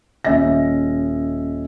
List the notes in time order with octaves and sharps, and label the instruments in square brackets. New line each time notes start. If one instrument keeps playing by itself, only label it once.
[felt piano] D#1 C#4 D#5 E5 A#6